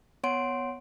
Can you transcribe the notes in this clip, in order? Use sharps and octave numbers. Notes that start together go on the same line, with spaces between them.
B3 C#5 F#5 C6 D7